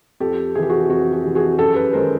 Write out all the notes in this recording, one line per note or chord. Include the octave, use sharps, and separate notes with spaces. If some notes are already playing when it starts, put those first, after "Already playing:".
F2 G4 A4
C3 E3 G4 G#4
F#4 G#4
F2 F#4
G4
C3 E3
F#4 G#4
F#2 G4 A4
A4 B4
D#3 G#3 A#4 C5